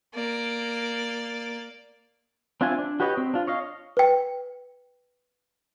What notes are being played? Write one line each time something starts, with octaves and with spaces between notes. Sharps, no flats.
A#3 D5
C4 D4 F4 E5 G#5
D4
F#4 G4 B4 C#5 D#5
C4
D4 F4
C#5 D#5 F5
B4 G5